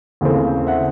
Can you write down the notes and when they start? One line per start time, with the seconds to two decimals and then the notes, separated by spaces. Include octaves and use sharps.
0.21 D#2 C#3 E3 A3 C4
0.67 E5 F#5